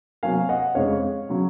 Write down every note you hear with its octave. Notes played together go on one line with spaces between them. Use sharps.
C3 F#3 A#3 F5 G#5
D#5 F#5
F2 C#3 G#3 C#4 C#5 F5
C#3 F#3